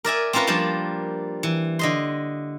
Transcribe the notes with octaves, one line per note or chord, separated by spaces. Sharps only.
A#4 D5 E5 G#5
C4 C#4 F4 A#4 B4
F3 G3 A#3 D4 A5
E3
D3 D#5 C6